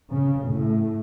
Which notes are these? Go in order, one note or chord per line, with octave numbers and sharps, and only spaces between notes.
C#3
A2